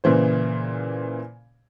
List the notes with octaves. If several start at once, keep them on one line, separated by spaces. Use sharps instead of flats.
A#2 C#3 E3 C5